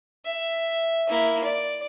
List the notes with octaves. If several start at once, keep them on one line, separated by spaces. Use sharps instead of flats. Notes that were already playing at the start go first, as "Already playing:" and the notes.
E5
A#3 E4
D5